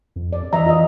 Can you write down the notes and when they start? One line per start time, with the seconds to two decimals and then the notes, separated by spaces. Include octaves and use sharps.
0.16 F2
0.33 D5
0.53 E3 D#5 E5 A#5
0.66 F4 D#5